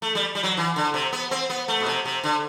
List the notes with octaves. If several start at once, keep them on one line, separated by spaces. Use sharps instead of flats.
A3
G3
G3
F#3
E3
D3
C3
B3
C4
B3
A3
B2
C3
C3
D3